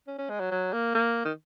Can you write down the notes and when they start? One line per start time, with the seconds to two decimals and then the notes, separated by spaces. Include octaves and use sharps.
0.07 C#4
0.18 C#4
0.29 G#3
0.40 F#3
0.51 F#3
0.73 A#3
0.95 A#3
1.25 D#3